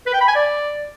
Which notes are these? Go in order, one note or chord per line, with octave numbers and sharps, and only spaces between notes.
B4
G5
B5
G#5
D5